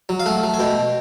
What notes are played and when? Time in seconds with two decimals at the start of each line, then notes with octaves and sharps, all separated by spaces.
0.09 F#3
0.20 F5
0.26 A3 F#5
0.43 A3
0.54 G#5
0.59 B2 G5